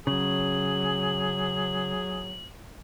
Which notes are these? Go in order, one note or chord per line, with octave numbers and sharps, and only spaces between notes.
C#3 F#3 G#4 F#7